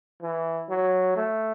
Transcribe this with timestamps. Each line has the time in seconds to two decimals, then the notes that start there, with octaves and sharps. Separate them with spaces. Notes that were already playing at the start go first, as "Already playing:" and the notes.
0.22 E3
0.69 F#3
1.16 A3